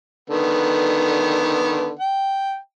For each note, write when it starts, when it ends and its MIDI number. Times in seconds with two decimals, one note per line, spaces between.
0.30 1.93 50
0.30 1.93 51
0.30 1.93 59
1.99 2.57 79